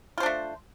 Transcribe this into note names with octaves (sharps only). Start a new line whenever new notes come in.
A3 D4 F4 C5